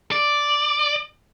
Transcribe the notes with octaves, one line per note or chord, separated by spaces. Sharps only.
D5